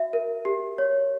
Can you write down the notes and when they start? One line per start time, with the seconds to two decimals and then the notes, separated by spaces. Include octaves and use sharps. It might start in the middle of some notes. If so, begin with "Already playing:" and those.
Already playing: F#4 E5
0.13 A#4
0.45 G4
0.78 C#5